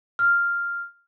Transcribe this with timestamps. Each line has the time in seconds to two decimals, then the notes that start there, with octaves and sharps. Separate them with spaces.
0.19 F6